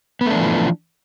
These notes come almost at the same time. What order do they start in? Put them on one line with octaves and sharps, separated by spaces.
B3 A3 D4 E3 F3